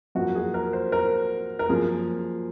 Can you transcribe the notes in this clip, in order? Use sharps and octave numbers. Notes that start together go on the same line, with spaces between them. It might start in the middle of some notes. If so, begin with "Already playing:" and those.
F#2 F3 A#3 F#4
G#4
A#4
C5
A#4
A#4
F#2 F3 A#3 G#4